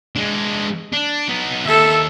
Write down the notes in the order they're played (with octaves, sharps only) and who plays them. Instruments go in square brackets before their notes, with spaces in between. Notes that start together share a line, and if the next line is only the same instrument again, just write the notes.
[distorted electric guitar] G#3 D4
D4
B3 D#4
[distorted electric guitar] D#2 [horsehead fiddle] A4 E5